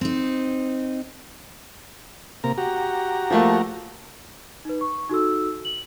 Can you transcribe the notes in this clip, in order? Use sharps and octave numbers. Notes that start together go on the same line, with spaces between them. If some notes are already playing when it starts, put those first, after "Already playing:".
C4 D#4
C3 A#3 A#5
F#4 G4 A#5
F3 A3 A#3
D#4 B4
C#6
D#4 F#4 A4 E6
F#7